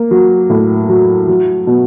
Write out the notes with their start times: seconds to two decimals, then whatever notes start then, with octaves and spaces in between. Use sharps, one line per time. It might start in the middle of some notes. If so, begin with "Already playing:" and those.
Already playing: A#3
0.11 F#3
0.50 A2
0.89 F#3
1.28 F#3
1.67 B2